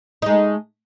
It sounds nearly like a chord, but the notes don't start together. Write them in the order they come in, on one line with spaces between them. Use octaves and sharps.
D#4 G#3 A3